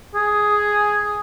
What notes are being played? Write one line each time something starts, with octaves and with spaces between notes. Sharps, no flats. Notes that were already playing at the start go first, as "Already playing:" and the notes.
G#4